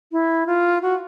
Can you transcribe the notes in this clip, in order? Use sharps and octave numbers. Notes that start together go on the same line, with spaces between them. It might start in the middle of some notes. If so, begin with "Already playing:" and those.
E4
F4
F#4